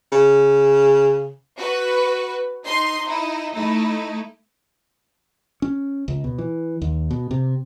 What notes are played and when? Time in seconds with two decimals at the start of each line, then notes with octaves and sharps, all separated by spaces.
0.12 C#3
1.58 F#4 B4
2.64 D#4 C6
3.08 D#4 E4
3.55 A3 D#4 E4
5.62 C#4
6.08 C#2
6.24 B2
6.38 E3
6.82 D#2
7.11 B2
7.31 C3